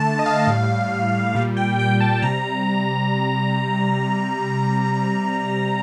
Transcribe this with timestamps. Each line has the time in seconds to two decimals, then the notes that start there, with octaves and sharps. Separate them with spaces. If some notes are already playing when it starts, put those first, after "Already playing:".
Already playing: D3 A3 A5
0.19 D#5
0.26 F5
0.47 A2 G3
1.35 A#2 G3 F5
1.57 G5
1.79 G5
1.97 G5
2.00 A5
2.22 C3 G3 A#5